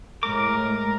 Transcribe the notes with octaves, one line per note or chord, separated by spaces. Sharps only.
A2 G#3 A#4 D6